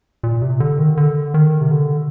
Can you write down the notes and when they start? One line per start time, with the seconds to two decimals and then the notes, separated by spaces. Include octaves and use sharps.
0.23 A#2
0.42 C3
0.60 D3
0.79 D#3
0.97 D3
1.34 D#3
1.61 C3
1.71 D3